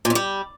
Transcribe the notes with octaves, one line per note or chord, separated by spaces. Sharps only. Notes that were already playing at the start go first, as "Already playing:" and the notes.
A#2
F2
G3